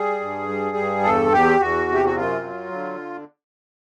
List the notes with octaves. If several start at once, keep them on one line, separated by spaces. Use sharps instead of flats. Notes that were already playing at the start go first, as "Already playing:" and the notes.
Already playing: G3 G#4
G2
G3
G2
E2 A4
E2 G4
E2 F#4
C3
G4
F#4
F#2 F4
F#3
D3